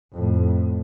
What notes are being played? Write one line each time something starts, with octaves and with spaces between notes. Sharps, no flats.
F2 A2